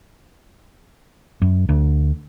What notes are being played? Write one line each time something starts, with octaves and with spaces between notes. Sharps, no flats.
F#2
D2